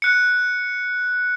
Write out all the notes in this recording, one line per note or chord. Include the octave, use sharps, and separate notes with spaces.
F#6 C#7